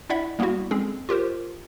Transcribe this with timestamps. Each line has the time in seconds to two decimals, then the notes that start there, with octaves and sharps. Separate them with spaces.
0.09 D4 E4 D5 E5 F#5 B5
0.39 G3 A#3 B3 C#4 E4 F#4
0.71 G#3 C4 C#4 G#4 A4
1.09 F4 G4 A#4 C5